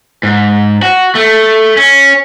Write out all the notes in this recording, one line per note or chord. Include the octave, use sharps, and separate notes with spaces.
G#2
F#4
A3
C#4